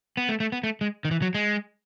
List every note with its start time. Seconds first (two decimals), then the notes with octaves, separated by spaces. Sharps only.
0.17 B3
0.29 A3
0.40 A3
0.52 B3
0.63 A3
0.81 G#3
1.05 D#3
1.11 E3
1.22 F#3
1.35 G#3